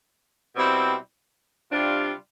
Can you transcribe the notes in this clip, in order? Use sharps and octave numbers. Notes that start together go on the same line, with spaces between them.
B2 G3 C4 E4
C3 G3 D4 F4